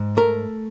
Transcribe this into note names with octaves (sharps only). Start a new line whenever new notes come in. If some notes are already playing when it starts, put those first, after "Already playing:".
Already playing: G#2
A3 A#4